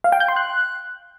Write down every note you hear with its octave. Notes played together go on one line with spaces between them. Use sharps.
F5
G5
G6
C6
F#6